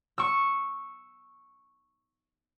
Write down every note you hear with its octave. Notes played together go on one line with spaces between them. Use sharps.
C#6 E6